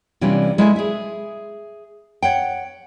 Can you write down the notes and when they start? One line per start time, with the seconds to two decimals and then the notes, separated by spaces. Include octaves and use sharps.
0.21 C3 E3 G3 C#4 D4 F4
0.58 G#3 E4 A4 A#4 E5 G#5
0.76 G#4 E5
2.22 C#5 F#5 G5